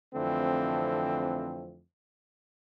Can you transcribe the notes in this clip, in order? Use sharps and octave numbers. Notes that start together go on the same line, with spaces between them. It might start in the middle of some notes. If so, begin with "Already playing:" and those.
F2 D3 E3 A3 C4